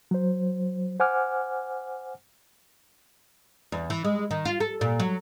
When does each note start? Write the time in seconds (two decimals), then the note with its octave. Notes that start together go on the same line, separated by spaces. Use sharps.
0.11 F#3 C5
1.00 C5 F#5 G#5 D6 F6
3.72 E2
3.90 E3
4.04 G#3
4.31 D#3
4.45 F4
4.60 A4
4.81 A#2
5.00 F#3